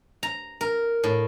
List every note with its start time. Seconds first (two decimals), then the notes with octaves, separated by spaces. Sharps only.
0.23 A#5
0.61 A#4
1.04 A2